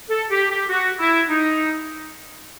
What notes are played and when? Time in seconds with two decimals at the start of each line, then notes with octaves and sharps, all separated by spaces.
0.10 A4
0.31 G4
0.50 G4
0.70 F#4
1.00 E4
1.29 D#4